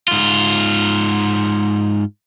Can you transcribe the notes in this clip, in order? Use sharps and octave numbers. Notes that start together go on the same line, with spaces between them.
G#2 F4